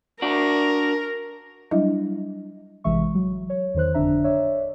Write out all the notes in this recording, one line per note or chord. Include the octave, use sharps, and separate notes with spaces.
D4 F#4 A#4
F#3 G3 D4 E4 D#5 E5
A1 C3 E3 G#3 E5 C#6
F#3
C#5
E2 D#3 C5 F#6
G1 F2 D3 D4 E5 A#5
C#5 D5 E5